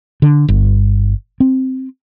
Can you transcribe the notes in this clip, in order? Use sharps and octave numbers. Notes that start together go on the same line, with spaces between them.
D3
G1
C4